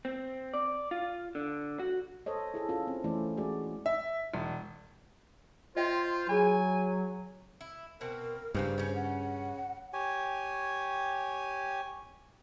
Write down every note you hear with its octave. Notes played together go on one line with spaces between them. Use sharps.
C4
D5
F4
D3
F#4
A4 C5 C#5 D#5
E4 G#4 A4
C#4 F4 G#4 A4
C4
E3 A3 C#4 E4 C5 D5
G#3 C#4 F#4 G#4 C#5 D5
E5
E1
F4 C5 D#5 E5 G5
F#3 G#4 G#5 B5
E4
B2 C4 A#4
G2 C#3 G3 A#3 C5
C#3 C#4
F#5
G4 C#5 G#5